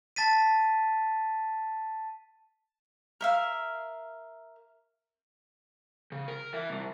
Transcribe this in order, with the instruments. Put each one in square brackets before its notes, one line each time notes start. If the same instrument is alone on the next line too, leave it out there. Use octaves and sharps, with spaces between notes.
[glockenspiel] A5 A6 B6 D#7
[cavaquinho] A#4 E5 F5
[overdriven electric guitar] C#3
A#4
E3 E5
C2